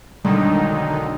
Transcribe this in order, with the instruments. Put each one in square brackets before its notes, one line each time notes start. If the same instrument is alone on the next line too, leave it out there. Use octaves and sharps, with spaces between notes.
[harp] B1 [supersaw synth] D3 D#3 D#4 [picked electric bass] G3 G#3